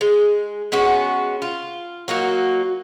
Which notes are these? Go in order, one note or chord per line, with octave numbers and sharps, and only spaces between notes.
G#3
G#3 B3 C#4 F#4
F4
F#3 A#3 D#4 F#4